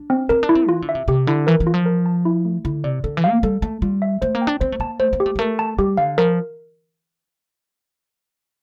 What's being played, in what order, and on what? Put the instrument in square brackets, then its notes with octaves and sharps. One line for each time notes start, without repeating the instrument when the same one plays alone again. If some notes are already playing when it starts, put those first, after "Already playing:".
Already playing: [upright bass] D4
[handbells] C4
[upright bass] C4 [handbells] A#4
[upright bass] D4
[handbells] E4
[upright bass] C4
[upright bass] E3 [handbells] F4
[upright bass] D3
[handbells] E5
[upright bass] C3
[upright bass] C3 [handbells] G4
[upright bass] D3 [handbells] E4
[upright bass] E3 [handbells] A#4
[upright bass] E3
[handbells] F4
[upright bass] F3
[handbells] A#4
A5
E4
A3
[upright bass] D3 [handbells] E4
[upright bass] C3 [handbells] D5
[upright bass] D3 [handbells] A4
[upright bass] E3
[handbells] F5
[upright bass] A#3
[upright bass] G3 [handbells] A4
[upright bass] A3 [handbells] A5
[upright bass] G3 [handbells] F4
[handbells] E5
[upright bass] A3 [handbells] C5
[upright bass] A#3
[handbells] G5
[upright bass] D4
[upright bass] C4 [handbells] C5
[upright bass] A3
[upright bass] A#3 [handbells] A5
[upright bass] A3 [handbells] C5
[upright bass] A#3
[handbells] G4
[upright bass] A3
G3
[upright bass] A3 [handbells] A#4
[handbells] A5
[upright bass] G3 [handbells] G4
[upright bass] D3 [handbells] F5
[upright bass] F3 [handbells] A#4